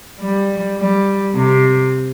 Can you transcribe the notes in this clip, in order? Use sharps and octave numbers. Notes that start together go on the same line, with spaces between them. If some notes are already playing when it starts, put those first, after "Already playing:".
G3
G3
C3